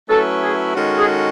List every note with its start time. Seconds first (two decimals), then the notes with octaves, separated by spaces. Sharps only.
0.08 F#3 A3 C#4 E4 A4 B4
0.42 G#4
0.75 D#3 G#3 C#4 F#4 A4
0.98 G#4